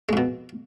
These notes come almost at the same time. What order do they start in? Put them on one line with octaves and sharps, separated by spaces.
G#3 F2 B2